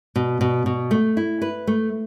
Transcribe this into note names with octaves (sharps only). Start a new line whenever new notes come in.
B2
B2
B2
A3
E4
B4
A3